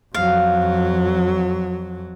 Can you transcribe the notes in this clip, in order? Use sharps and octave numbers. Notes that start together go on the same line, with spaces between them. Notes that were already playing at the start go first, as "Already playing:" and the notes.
F2 F#3 F5